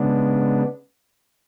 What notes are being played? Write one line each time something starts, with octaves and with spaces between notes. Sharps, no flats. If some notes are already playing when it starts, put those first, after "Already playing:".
Already playing: C#3 G#3 B3 D4